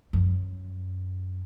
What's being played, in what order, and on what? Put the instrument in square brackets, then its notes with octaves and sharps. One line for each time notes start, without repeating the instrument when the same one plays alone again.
[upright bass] F#2